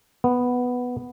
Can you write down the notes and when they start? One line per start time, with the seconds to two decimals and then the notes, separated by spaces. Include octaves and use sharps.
0.24 B3